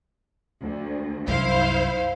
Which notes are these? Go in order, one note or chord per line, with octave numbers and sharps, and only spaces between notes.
D2
C2 F#2 E4 C5 F5